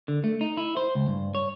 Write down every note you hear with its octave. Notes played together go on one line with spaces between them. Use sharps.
D3
A3
D#4
E4
C5
C#2
G2
C#5